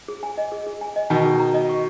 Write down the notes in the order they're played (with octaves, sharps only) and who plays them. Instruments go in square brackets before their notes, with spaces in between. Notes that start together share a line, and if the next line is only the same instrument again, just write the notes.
[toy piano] G#4
G#5
D#5
G#4
G#4
G#5
D#5
[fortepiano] B2 D#3 [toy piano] C#6
[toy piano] G#4
A#5
D#5
C#6